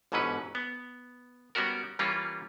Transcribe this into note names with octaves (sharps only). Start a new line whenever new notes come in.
G1 G#2 B2 E3 C#4 B4
B3
G3 B3 C#4 F#4 A#4
E3 G3 A#3 C#4 F4